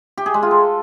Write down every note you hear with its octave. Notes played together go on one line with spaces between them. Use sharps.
G4
G#4
G#3
F4
A4